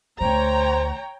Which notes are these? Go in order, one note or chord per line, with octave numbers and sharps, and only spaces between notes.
D2 A3 C5 C#5 G5 A#5